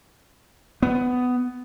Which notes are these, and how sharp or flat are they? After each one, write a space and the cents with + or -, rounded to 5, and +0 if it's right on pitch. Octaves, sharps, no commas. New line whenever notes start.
B3 +15